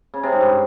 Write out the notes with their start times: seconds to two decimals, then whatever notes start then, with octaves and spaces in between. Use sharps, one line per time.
0.14 C#3
0.23 C3
0.32 G#2
0.41 G2